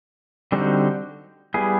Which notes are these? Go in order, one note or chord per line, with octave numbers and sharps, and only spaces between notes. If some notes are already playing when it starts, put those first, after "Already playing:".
D3 G3 C4 D#4 F#4
G3 B3 E4 G#4